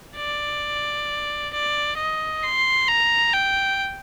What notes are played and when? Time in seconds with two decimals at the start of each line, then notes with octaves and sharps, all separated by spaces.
0.17 D5
1.53 D5
1.98 D#5
2.43 C6
2.88 A#5
3.33 G5